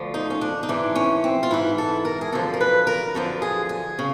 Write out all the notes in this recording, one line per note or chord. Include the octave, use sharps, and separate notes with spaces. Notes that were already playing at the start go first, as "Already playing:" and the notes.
Already playing: D2 D3 F3
D#4
C#4
D4
D#4
G#2 E3 D4
C#4
C4
F4
G#2 E3 E4
A4
A#4
G#4
F#2 D3 F3 A4
A#4
B4
A#4
F#2 D3 F3 A4
G#4
G#4
C#3